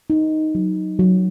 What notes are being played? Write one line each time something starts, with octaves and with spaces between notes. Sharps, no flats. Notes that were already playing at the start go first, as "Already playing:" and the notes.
D#4
F#3
F#3